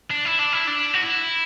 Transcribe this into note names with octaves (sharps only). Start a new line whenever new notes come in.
D4
E4
D4
E4
D4
F#4
E4